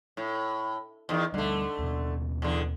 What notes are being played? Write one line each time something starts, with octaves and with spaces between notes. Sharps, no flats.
A2
E2 D#3
D2 D3 G3 A3
D#2 B2
E2 D3